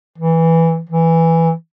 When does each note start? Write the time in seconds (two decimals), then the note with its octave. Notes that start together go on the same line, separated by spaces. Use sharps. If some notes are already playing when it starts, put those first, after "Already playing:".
0.18 E3
0.89 E3